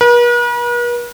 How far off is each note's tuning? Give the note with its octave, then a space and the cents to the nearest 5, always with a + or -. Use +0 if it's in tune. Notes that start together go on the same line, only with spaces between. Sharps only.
B4 -45